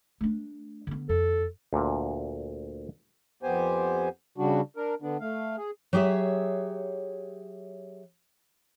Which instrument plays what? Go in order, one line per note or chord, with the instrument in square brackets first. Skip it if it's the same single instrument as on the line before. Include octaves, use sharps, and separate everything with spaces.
[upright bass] A3 D4
D3 B3
[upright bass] F2 [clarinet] A4
[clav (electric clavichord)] D2 A#2
[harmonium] F2 B3 G4 C5 G#5
C#3 G3 D4 F#4
D4 A#4
D3 B3 D4
A3 F5
G#4
[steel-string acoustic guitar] F#3 G4 G#4 C#5 E5